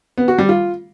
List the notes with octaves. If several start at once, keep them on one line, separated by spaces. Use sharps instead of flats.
B3
F#4
G3
F4